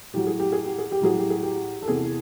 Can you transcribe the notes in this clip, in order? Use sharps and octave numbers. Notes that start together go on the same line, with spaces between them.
A2 F#3 G4
G#4
G4
G#4
G4
G#4
G4
A2 F#3 G#4
G4
G#4
G4
A4
E2 C3 E3 G#4